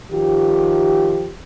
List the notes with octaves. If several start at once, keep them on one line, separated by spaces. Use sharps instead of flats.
D#3 F3 F4 G4